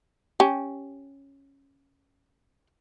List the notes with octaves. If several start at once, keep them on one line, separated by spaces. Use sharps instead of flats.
C#4 G4